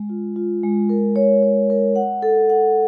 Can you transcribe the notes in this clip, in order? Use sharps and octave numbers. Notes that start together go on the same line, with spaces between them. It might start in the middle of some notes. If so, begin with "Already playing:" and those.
Already playing: G#3
F4
F4
G#3
A#4
C#5
C#5
A#4
F#5
A4
F#5